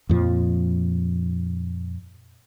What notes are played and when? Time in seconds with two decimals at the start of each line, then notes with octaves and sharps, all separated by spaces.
0.09 F2 A#2 F3